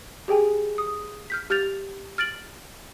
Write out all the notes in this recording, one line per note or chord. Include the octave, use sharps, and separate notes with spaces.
G4 G#4 G5 G#5
D#6
F6 G6 B6
G4 F6 G6 A6 F7
F6 A6 D7 F#7